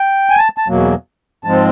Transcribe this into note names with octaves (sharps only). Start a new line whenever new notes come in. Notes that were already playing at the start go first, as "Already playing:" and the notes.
Already playing: G5
G#5
A5
A5
E2 B2 F#3 A#3
G#2 F3 G#3 C4 A5